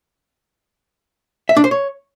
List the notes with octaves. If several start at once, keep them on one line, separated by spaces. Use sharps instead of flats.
E5
D4
C5
C#5